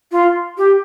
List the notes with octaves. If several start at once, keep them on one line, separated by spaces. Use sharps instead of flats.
F4
G4